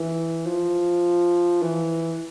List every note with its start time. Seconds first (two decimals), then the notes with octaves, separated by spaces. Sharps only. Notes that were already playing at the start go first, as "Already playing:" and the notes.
Already playing: E3
0.47 F3
1.62 E3